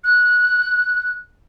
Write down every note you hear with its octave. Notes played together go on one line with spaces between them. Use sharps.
F#6